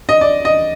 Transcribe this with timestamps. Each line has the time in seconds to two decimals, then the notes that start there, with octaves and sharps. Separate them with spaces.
0.09 D#5
0.21 D5
0.45 D#5